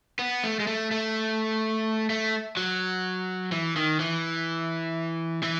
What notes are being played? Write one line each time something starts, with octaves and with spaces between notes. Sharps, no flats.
B3
A3
G#3
A3
A3
A3
F#3
E3
D#3
E3
E3